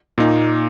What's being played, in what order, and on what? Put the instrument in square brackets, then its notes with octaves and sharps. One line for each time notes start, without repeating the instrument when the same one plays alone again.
[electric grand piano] A#2 A#3 D#4